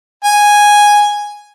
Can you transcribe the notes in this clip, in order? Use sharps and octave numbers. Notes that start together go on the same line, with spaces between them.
G#5